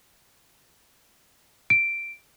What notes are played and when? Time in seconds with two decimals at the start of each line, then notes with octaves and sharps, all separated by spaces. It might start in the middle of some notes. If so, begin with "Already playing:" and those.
1.70 D7